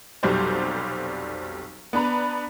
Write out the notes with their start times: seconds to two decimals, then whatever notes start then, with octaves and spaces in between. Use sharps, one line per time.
0.23 F1 B1 F#3 G3 C5 D5
1.93 B3 D4 B4 A#5